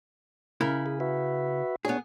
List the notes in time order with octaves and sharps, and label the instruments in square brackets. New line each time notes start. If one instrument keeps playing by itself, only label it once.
[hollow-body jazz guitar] C#3 E4 A#4
[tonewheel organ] G#4
F#4 B4 E5
[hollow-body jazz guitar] B3 G#4 [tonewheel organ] D4 C#5